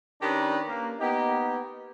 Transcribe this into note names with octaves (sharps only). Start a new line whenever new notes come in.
D#3 C#4 D4 G4 B4 D5
A#3
A#3 B3 D#4 G4